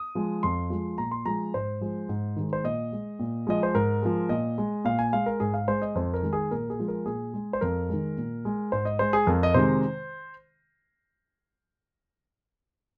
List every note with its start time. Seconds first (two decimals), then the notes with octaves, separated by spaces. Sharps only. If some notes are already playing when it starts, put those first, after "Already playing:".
Already playing: D#6
0.15 F3 G#3
0.43 F2 C6
0.70 F3 G#3
0.98 A#2 A#5
1.11 C6
1.25 F3 G#3 A#5
1.54 G#2 C5
1.81 F3 G#3
2.09 G#2
2.36 D#3 G#3
2.53 C5
2.64 A#2 D#5
2.92 G#3
3.19 A#2
3.47 F3 G#3 D#5
3.63 C5
3.74 G#2 A#4
4.02 F3 G#3
4.29 A#2 D#5
4.58 G#3
4.85 A#2 F5
4.99 G#5
5.13 G#3 F5
5.26 A#4
5.40 G#2 G#4
5.54 F5
5.68 G#3 C5
5.82 D#5
5.95 F2 C5
6.14 A#4
6.23 D#3 G#3
6.33 G#4
6.51 A#2 A#4
6.70 G#4
6.79 F3 G#3
6.88 A#4
7.06 A#2 G#4
7.34 G#3
7.53 C5
7.61 F2 A#4
7.89 D#3 G#3
8.17 A#2
8.45 G#3
8.72 G#2 C5
8.85 D#5
8.99 G#3 C5
9.13 G#4
9.27 F2 A#4
9.43 D#5
9.54 C3 D#3 G#3 C5